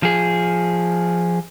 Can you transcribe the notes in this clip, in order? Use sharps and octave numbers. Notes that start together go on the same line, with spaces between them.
F3 G#4